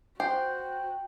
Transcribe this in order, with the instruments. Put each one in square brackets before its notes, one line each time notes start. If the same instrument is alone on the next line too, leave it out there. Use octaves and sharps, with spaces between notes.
[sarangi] F#4 [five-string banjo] C5 [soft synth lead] G5